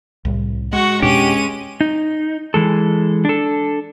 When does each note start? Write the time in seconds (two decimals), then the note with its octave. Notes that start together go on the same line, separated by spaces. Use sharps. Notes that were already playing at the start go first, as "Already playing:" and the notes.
0.25 C2 A2 G3
0.73 G#3 F#4 C#6
1.02 F2 B2 C#4 D4 G4 D#7
1.81 D#4
2.54 E3 G#3 A4
3.25 D4 A4